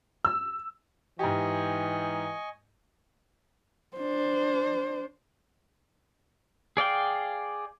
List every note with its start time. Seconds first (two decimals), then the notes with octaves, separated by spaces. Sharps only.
0.25 E6
1.19 G#2 E3 G4 D#5 G#5 C#6
3.97 D4 C5
6.77 G#4 D5 F5 G5